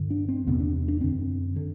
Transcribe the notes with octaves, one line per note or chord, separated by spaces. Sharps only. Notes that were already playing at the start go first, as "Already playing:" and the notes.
Already playing: G2 D3
D4
C4
E2 C3 B3
D4
D4
F#2 D3 C4
D3